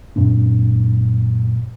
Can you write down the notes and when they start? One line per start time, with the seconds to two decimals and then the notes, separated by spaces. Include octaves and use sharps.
0.16 F#2 A#2 C4 D4